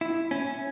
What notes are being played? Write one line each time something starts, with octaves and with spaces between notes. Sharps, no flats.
E4
C#4